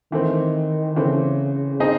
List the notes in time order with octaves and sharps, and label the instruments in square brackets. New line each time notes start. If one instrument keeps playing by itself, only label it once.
[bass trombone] D#3 [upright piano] E3 A3 C4
[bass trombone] C#3 [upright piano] E3 A3 C4
[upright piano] C4 D#4 G#4 D#5